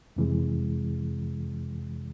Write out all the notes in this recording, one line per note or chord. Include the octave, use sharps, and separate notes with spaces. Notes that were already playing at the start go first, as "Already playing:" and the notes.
F2 C3 E3 G#3